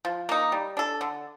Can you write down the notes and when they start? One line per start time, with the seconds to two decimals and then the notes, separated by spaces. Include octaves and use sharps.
0.05 F3
0.29 A#3 D#4
0.52 G3
0.77 D4 A4
1.01 D3